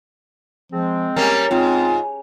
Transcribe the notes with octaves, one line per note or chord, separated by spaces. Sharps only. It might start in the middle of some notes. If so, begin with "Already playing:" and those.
F3 G#3 C4
G3 A#3 C#4 A#4
G#2 C4 F4